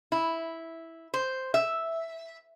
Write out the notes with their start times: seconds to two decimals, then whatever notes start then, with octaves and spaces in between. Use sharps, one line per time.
0.12 E4
1.14 C5
1.54 E5